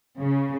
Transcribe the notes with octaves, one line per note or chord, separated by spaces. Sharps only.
C#3